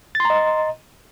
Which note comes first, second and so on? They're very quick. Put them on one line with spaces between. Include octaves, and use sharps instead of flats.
A6 C6 A#5 D#5